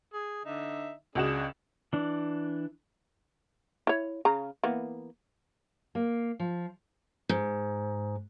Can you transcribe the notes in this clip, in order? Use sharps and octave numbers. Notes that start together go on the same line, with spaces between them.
G#4
D3 D#4 E5
C#2 D4 F#4 G#4 E7
E3 D4
E4 C#5
C#3 A#5
E3 A#3 B3
A#3
F3
G#2